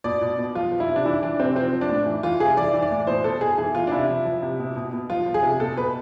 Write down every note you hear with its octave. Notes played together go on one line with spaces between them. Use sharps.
B2 D5
B2
B2
F3 F4
F3
E4
C3
D4
E3 E4
E3 D4
C3 C4
F3 C4
F3
D4
A2
E3
E3 F4
C3 G#4
E3 D5
E3
D5
A2
B2 C5
B2 A4
B2 G#4
E3 G#4
E3 F4
D4
C3 E4
F3
F3
C3
B2
B2
B2
F3 F4
F3
G#4
C3
B2 A4
B2 B4